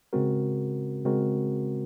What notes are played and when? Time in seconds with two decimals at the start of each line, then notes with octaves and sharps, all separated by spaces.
0.13 C#3 G#3 C4 F#4 A#4
1.05 C#3 G#3 C4 F#4 A#4